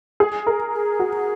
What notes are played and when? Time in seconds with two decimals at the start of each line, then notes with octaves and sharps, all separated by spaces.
0.20 G#4
0.47 A#4
0.73 G#4
0.99 F#4